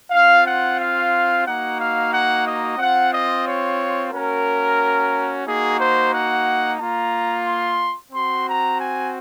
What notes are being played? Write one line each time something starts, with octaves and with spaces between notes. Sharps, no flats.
C4 F4 F5
F#5
F5
A#3 D#4 F#4 F#5
F5
F#5
D#5
C4 F4 F#5
D#5
C#5
A#3 C#4 F#4 A#4
A#3 D#4 F#4 G#4
C5
F#5
A#3 F4 A#5
C6
C4 F#4 C6
A#5
G#5